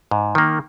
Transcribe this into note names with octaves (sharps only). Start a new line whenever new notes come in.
G#2
D#3 A#3